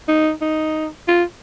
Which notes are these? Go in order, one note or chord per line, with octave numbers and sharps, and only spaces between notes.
D#4
D#4
F4